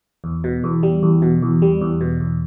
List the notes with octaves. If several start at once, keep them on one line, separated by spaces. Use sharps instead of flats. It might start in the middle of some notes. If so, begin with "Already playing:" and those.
E2
B2
E2
G3
E2
B2
E2
G3
E2
B2
E2